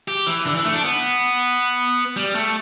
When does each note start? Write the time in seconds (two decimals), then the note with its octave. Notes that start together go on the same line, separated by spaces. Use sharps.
0.08 G4
0.27 E3
0.46 D3
0.55 E3
0.65 A3
0.74 D4
0.84 B3
2.16 G3
2.35 A3